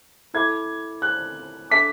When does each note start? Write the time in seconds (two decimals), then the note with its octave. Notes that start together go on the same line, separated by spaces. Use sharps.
0.34 E4 A4 E5 B5 D6 G#6
1.02 F#6
1.70 D4 A4 E5 A5 D6 B6